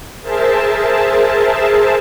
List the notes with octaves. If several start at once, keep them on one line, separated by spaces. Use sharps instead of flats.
G#4 A#4 C5 E5 A5